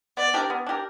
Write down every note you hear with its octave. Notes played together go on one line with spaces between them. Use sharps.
B3 D5
D4 G4 A#4
B3
D4 G4 A#4